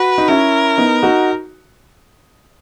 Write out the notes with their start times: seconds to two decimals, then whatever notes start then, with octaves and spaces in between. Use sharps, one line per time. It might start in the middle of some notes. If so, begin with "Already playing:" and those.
Already playing: F#4 B4
0.18 D#4
0.28 C#4 E4 A#4
0.78 B3 D#4
1.03 D#4 F#4